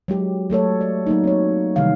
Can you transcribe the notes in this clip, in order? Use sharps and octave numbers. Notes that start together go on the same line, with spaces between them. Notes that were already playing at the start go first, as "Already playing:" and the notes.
F#3 G#3 G4
F#3 A3 A4 C#5
D5
F#3 A#3 D#4
C4 C#5
C3 D#3 E3 G3 F5